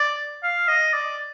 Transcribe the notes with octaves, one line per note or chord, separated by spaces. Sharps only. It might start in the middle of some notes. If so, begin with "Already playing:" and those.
Already playing: D5
F5
D#5
D5